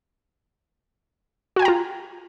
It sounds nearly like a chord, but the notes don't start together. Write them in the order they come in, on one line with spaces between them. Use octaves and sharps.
F#4 G#5 G5 A#5 F4